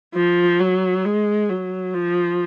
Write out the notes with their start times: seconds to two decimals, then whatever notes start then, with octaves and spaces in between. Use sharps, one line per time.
0.15 F3
0.60 F#3
1.05 G#3
1.50 F#3
1.94 F3